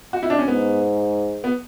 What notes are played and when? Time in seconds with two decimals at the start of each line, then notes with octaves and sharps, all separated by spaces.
0.13 F#4
0.23 E4
0.30 D4
0.39 C#4
0.47 G#2 B3
1.44 B3